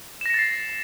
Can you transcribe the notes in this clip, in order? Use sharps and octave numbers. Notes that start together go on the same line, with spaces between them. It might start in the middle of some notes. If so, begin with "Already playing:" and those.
A6 A#6 C7 C#7 E7